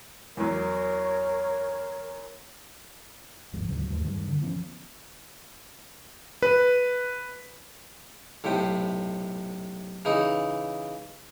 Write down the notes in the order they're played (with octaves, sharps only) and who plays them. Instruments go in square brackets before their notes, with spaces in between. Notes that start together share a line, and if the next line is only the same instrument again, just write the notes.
[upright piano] E2 F#3 [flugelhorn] A#4 [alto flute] C#5
[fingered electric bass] D1 G1 G#2 F3
D2 G#2 C#3 F#3
D#2 G#2 F#3 A3
G2 D#3
D3 D#3
E3 F3 B3 C#4
[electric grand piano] B4
[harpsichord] B1 A2 C3 G5
C#3 E3 D#4